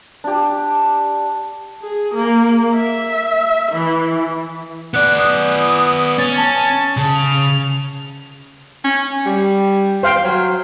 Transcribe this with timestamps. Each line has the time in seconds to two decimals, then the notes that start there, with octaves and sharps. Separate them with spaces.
0.24 D4 G4
1.82 G#4
2.14 A#3
2.75 E5
3.72 E3
4.94 B3 D5 F#6
5.18 D#6
6.18 C#4 A6
6.37 A5
6.97 C#3
7.15 F7
8.85 C#4
9.26 G3
10.03 C5 F5 G5
10.24 F#3